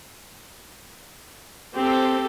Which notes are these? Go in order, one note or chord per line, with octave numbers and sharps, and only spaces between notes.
C4 G4 A4